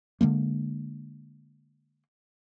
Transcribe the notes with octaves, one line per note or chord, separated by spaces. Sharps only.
D3 F#3 G#3 A#3